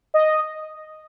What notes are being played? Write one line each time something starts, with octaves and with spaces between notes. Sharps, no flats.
D#5